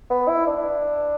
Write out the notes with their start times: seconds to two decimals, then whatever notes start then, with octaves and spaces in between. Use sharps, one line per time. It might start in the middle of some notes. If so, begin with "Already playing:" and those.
0.10 B3
0.28 E4
0.47 D4